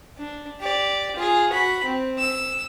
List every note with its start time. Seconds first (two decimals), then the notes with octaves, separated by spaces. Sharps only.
0.18 D4
0.61 G4 D5
1.16 F4 G#4
1.50 F#4 B5
1.84 C4
2.19 E6